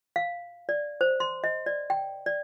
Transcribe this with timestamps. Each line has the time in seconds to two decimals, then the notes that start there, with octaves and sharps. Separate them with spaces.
0.16 F5
0.69 D5
1.01 C5
1.20 C6
1.44 D#5
1.66 D5
1.90 G5
2.26 D5